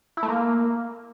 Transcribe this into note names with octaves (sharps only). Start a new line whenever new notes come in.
E4
A3
A#3